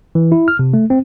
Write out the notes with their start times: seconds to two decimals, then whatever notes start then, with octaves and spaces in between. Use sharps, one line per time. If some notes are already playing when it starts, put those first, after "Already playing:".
0.15 E3
0.32 E4
0.48 F6
0.59 C3
0.74 A3
0.90 C4